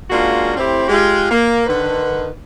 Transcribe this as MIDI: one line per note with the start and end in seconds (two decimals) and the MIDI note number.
0.10 0.55 56
0.10 0.55 58
0.10 0.55 61
0.10 0.55 62
0.10 0.55 65
0.10 0.55 66
0.57 0.85 45
0.57 0.85 60
0.57 0.85 64
0.57 0.85 67
0.57 0.85 72
0.89 1.29 56
0.89 1.29 65
0.89 1.29 67
1.31 1.65 58
1.67 2.27 50
1.67 2.27 51
1.67 2.27 71